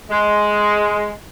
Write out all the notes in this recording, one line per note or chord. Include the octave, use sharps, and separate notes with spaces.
G#3